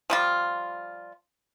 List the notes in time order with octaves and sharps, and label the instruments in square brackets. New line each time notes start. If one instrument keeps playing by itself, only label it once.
[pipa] F3 G3 F4